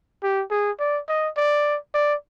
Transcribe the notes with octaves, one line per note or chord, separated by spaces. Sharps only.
G4
G#4
D5
D#5
D5
D5